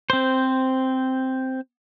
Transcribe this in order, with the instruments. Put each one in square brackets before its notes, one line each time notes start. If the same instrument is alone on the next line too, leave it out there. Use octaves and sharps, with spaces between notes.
[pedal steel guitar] C4 C5